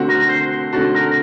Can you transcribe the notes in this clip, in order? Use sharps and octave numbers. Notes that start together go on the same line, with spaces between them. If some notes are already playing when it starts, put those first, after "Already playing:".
Already playing: D3 A3 C4 F#4
A#4
C5
D3 A3 C4 F#4 A4
A#4